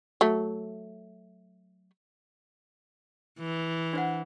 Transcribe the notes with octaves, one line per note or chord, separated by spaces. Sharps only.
F#3 A3
E3
D4 C5 F#5